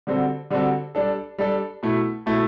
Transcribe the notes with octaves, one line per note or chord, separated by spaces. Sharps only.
D3 G3 C4 F#4 A4
D3 G3 C4 F#4 A4
G3 D4 A4
G3 D4 A4
B2 A3 E4
B2 A3 E4